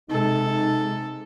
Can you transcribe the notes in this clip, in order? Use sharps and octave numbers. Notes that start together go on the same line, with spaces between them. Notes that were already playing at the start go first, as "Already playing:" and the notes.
C3 G#3 D#4 A4